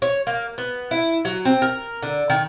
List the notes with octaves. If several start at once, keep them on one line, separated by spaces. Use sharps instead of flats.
C#5
A#3
B3
E4
F#3
C4
A#4
D3
D#3